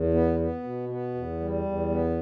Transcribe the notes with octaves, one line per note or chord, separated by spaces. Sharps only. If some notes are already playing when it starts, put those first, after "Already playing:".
Already playing: E2
B3
B3
B2
B3
E2
G3
E2
B3